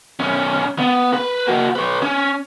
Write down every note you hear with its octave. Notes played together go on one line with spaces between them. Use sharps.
B1 C#4
B3
B4
A#3 F#4
B4 C#5
C#4